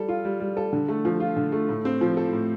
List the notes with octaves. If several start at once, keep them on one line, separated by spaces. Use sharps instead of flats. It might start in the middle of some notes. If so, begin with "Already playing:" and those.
Already playing: G3 A4
F4
G3
G3
A4
D3
A3
F3
F4
D3
A3
A2
C4
F3
A4
A2